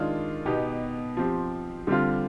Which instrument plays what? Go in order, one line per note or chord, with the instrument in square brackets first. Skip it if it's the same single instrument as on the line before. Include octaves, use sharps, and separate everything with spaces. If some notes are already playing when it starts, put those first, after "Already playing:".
Already playing: [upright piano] D#3 G#3 D4 F4
B2 B3 D#4 G4
F3 C4 G4
D3 G3 C4 F4